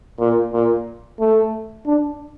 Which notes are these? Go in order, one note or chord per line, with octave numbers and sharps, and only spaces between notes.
A#2
A#2
A3
D4